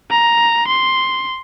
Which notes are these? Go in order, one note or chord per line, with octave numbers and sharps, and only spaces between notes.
A#5
C6